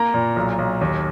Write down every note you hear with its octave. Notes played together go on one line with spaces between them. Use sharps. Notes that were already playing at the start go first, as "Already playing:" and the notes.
Already playing: A#3 A#5
A#2
B1
B1
D#2